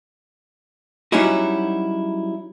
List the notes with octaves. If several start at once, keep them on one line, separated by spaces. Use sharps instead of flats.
F#3 G3 C#4 D#4 E4 F#4